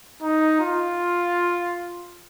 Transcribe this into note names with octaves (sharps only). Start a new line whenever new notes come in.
D#4
F4